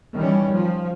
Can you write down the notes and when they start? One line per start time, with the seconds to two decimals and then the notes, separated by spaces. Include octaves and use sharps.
0.15 D#3 E3 G3 C#4
0.52 F3